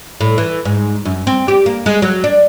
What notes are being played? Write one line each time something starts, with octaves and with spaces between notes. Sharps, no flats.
A2
E3
G#2
F#2
C4
G4
A#3
G#3
F#3
D4